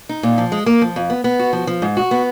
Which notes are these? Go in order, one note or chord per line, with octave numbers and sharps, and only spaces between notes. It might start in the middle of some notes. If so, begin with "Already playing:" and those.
D#4
A#2
F3
G#3
A#3
F3
F2
B3
B3
F#4
F3
F3
G#2
F#4
B3